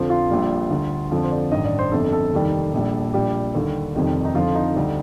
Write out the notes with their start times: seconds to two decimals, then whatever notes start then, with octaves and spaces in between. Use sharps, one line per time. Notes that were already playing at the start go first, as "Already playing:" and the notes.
Already playing: F2 D3 F3 C5
0.10 F4
0.30 A#1 A#2 G3
0.70 D2 D3 G3
1.11 F2 D3 F3
1.24 C5
1.31 D5
1.52 A1 G2 D#3 D#5
1.65 D5
1.79 C5
1.92 G1 F2 D3 A4
2.13 A4
2.33 F1 D#2 D#3 G3
2.73 A#1 A#2 G3
3.13 A#1 A#2 G3 G4
3.54 D#2 D3 G3
3.95 F1 F2 D#3 G3
4.25 D#4
4.35 F2 D3 F3 F4
4.55 D#4
4.76 D2 D3 G3